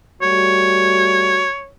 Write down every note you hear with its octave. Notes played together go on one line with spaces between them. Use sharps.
G3 A3 F#4 C#5